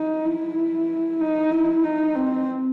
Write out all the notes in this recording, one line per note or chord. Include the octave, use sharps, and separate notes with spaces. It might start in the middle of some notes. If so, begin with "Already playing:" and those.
Already playing: D#4
E4
D#4
E4
D#4
C4